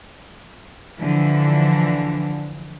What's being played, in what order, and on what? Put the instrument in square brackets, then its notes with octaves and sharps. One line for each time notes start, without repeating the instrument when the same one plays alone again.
[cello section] D3 E3 F3